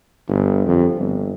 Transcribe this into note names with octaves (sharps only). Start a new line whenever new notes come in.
G1
F2
G1